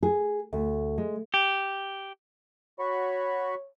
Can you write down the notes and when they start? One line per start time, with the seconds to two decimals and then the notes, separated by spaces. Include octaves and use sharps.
0.03 G#4
0.53 D2
0.98 G#3
1.34 G4
2.79 F#4 C#5 B5 C#6